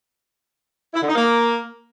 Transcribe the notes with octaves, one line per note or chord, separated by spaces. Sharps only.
E4
D3
D#4
A#3